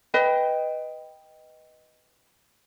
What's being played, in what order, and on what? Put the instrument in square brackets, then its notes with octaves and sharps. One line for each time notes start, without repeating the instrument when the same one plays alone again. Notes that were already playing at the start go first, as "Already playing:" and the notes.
[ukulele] B4 D#5 G5